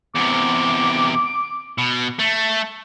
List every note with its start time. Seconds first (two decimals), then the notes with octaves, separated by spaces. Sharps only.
0.15 E2 C3 D6
1.78 B2
2.19 A3